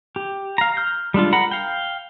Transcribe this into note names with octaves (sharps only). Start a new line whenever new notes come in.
G4
F5 A#5
F6 G6
G3 G#3 D4 F4
A#4 F#5 A#5 B5
F5 G5